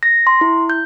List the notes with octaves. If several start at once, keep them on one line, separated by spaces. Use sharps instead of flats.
A#6
C6
E4
G6